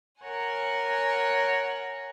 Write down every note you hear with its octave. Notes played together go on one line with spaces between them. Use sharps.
A#4 C#5 F#5 G#5